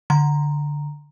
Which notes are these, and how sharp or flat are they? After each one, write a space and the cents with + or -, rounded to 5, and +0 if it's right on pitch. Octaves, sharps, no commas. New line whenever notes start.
D3 +0 A#5 +0